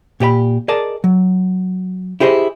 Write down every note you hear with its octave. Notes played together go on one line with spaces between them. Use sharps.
A#2 G4 D5 B5
G#4 A#4 D5 D#5 A5
F#3
E4 G4 G#4 C5 C#5 D#5